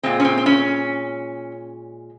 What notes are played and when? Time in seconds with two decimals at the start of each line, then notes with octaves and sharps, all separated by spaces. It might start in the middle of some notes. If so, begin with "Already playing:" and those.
0.03 A#2 G#3 C4
0.20 C#4
0.25 C4
0.38 C4
0.46 C#4